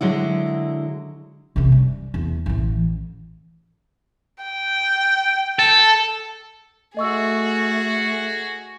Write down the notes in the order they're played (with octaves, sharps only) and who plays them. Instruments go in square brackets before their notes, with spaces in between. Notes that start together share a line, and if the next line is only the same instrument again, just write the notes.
[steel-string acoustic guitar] D3 F#3 G#3 E4
[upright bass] F#2 C3
G3
E2
A1 E3
[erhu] G5
[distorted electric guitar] A4
[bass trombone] A3 [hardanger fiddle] F#4 G#4 [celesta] D#5 C#6 E6